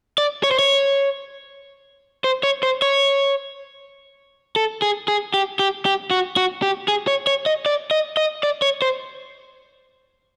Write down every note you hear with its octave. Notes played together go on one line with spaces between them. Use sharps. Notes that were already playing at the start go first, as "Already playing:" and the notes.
D5
C#5
C5
C#5
C5
C#5
C5
C#5
A4
G#4
G#4
G4
G4
G4
F#4
F#4
G4
G#4
C#5
C#5
D#5
D5
D#5
D#5
D5
C#5
C5